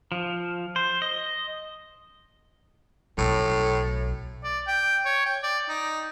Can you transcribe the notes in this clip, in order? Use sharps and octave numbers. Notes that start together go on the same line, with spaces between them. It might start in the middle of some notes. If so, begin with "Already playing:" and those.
F3
C5
D#5
B1 A2
D5
G5
C#5
G5
D5
D#4